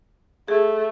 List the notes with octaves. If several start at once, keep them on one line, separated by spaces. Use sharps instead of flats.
A3 G#4